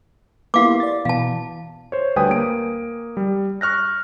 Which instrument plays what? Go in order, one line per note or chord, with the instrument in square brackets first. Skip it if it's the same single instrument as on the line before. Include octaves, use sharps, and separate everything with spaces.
[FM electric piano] A#3 B3 E4 [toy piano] G4 F5 D6
[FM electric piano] D5 A6
[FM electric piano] B2 E3 [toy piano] F5 A5
[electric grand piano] C5 C#5
D2 G3 B4 G5 G#5 D#6
A#3 D7
G3
C#6 F6 F#6 A#6